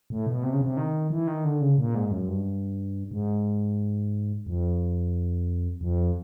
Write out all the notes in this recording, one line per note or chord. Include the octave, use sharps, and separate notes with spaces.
A2
B2
C3
C#3
C3
D#3
E3
D#3
D3
C#3
A#2
G#2
F#2
G2
G#2
F2
F2